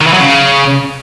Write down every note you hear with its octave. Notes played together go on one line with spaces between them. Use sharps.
D#3
E3
F#3
C#3